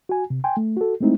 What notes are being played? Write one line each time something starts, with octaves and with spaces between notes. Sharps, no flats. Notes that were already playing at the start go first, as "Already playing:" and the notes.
F#4 G#5
C3
G5 G#5 C6
A3
F#4 A4
G#3 A3 C4 D#4 E4